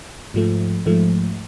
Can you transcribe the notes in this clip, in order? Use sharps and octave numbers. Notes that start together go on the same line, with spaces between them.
G#2 F3 A3
G#2 F3 A3